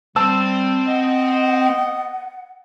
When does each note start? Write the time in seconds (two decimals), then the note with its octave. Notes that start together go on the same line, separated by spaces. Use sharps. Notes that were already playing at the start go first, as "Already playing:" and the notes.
0.16 G3 C4 C5 A5 E6
0.87 D#5 F#5